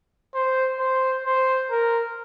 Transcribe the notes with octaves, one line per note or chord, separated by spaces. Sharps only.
C5
C5
C5
A#4